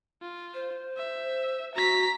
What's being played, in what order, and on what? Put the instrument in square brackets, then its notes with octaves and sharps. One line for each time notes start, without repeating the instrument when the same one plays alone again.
[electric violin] F4
[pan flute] C5
[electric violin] E5
[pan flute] F#4 [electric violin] A#5 B6